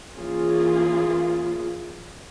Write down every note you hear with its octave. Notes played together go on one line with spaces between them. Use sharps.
E3 A#3 C#4 F4 G#4